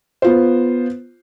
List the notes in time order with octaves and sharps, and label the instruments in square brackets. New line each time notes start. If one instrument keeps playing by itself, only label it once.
[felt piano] B3 F4 C5